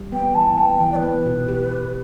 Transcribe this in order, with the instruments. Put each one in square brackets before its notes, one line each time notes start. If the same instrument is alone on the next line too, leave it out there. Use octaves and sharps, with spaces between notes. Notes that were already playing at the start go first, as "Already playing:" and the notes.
Already playing: [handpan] G3
[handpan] B3 [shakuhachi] G5
[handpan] E3 [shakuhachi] A5
[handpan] B3 [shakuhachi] G5
[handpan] E3
[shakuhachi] D5
B4
[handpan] B3
B2
G4
G4